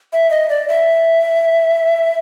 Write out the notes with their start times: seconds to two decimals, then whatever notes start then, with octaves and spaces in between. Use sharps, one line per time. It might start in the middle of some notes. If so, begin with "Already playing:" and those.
0.13 E5
0.31 D#5
0.49 D5
0.68 E5